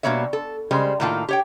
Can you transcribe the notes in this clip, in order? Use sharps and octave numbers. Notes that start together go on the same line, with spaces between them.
B2 G3 A#3 B3 C#5 E5
A4
C#3 G3 G#3 C5
A2 D#3 A#3 F4 A5
G4 C#5 G5